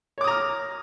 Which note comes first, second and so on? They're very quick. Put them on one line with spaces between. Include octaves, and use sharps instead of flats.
C#5 D6 D#6 A#5 F6